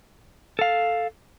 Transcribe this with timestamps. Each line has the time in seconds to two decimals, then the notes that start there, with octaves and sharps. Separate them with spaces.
0.59 A4 F5